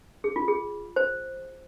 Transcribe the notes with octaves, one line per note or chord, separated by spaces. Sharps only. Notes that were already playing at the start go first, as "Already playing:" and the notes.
G#4
F4
G#4
C5